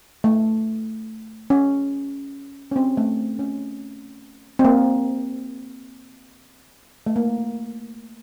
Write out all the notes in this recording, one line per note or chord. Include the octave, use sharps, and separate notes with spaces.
A3
C#4
C#4
C4
A3
C#4
C4
A#3
A3
A#3